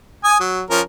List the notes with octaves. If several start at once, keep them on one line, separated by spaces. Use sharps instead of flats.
G#5 D#6
F#3
F3 C#4 A#4